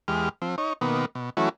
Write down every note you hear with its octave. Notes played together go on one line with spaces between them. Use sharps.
E2 G#3 G4 F6
F3 C4
D#4 C#5
B2 D#3 A#3 B3
B2
E3 F#3 A3 C#4 E4 F#4